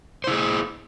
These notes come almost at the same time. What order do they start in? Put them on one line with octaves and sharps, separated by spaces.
C5 E4 G#4